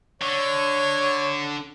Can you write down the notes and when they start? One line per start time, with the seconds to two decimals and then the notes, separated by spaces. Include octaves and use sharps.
0.22 D3 C#5